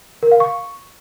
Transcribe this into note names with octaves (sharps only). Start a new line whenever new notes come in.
A#4
F5
C#6